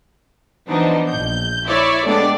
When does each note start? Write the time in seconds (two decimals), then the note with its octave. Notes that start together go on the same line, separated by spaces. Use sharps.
0.69 E3 F3 B3 D4 D#4 C5
1.10 A#1 G6
1.67 E4 C#5 D5 E5
2.05 G#3 A3 B3 D4 G4 D5